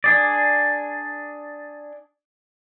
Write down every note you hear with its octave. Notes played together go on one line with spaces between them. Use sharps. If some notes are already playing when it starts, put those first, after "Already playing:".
D4 G#4 D5